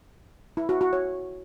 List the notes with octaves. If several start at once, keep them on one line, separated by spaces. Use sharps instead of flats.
E4
F#4
F#4
C#5